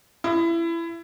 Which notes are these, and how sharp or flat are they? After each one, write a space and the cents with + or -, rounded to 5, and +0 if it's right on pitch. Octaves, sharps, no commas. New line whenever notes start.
E4 +25